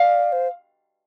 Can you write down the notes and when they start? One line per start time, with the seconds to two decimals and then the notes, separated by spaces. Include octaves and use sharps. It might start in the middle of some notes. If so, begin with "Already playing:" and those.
Already playing: D5 F5
0.32 C5